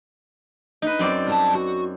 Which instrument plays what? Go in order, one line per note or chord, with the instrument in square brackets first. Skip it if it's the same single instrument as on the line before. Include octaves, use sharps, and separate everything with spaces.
[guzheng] D#4 B4
F#2 C4 D5
[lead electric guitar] G2 A5
F#4